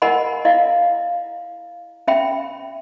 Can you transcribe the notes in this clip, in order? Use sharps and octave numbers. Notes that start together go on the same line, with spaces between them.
E4 A#4 D#5 F#5 G#5 B5
E4 D#5 F5
C#4 E5 G5 B5